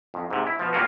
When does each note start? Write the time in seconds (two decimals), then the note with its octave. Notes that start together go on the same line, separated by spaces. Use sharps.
0.14 F2
0.30 G#2 C3
0.47 E4
0.59 B2 F3
0.73 C#3 G3 A#3 F4 F#4